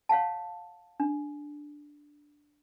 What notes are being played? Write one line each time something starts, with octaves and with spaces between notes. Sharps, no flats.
C#5 F5 F#5 A5
D4